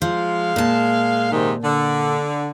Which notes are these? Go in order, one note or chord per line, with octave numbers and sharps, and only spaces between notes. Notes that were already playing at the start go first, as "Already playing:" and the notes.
F3 G#3 F5
A#2 A5
G#2 C3 D#3
D3